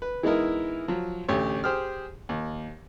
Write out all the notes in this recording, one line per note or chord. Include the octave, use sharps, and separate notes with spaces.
B4
E3 G#3 B3 D#4 E4 A#4
F3 F#3
A1 D2 G4 C#5
G4 G#4 C5 G5 D#6 F6
D#2